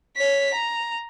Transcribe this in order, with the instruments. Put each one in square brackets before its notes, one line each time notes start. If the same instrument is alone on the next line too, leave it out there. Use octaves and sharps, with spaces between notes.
[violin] C#5 B6
A#5